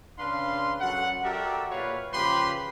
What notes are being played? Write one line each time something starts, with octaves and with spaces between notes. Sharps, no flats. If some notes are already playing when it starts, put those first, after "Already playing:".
C#3 D4 B4 F5 C6
F#2 F#4 A4 F#5
F#4 G4 A4 A#4 D5 E5
A#2 G4 B4 C#5 F5
C#3 F3 G4 B4 B5 C6